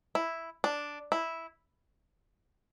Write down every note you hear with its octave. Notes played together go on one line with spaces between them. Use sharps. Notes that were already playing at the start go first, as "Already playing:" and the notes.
E4
D4
E4